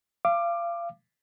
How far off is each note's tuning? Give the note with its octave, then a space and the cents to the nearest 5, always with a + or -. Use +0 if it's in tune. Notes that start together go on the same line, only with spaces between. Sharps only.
F5 -30 D6 +15